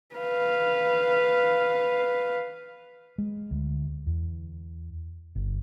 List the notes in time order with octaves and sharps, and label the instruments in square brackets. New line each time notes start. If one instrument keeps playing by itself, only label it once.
[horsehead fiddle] B4 F5
[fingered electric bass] G#3
D2
E2
G1